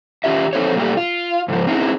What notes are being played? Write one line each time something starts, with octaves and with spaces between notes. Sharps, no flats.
D#3 C#4 F4 G4 E5
F2 C4 D#4 A4 C5 C#5
A#2 G3 A3 G4
F4
G#2 C#3 F3
C4 C#4 D#4 E4 G#4